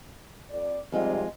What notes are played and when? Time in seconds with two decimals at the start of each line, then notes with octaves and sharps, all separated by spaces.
0.50 F2 D5
0.92 F2 G#2 C3 G3 G#3 F4